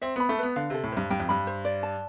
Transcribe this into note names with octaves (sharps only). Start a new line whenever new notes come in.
C4 E5
B3 B5
A3
B3 B4
D3 F5
C3 A4
A2
G2 C5
G2 G5
F2
G2 B5
C5
D5
A5